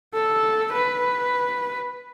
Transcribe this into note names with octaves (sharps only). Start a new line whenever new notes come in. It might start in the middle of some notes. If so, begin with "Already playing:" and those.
A4
B4